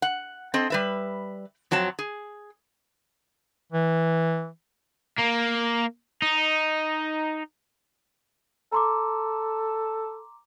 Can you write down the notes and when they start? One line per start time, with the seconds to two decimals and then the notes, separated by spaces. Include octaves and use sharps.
0.02 F#5
0.54 C4 A4 C5 D#5
0.70 G3 B4 E5
1.71 F2 F#3 C4 A5
1.99 G#4
3.73 E3
5.18 A#3
6.22 D#4
8.72 A4 A#5 C6 D6